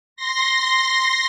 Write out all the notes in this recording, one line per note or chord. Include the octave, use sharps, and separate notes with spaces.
C6 A#6